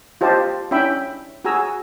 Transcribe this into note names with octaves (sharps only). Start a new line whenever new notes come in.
F4 G4 C5 D#5 A5
C#4 D4 E4 E5 G5 B5
F#4 G#4 G#5 A#5 E6